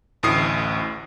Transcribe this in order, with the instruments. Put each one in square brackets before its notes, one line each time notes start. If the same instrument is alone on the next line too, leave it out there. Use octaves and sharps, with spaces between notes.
[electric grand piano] A1 D2 A2 D#6 C7